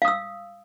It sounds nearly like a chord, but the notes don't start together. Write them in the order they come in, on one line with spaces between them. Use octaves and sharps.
F5 D#6 E6